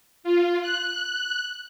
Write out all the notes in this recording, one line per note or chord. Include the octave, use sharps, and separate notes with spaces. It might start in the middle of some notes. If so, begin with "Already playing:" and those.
F4
F#6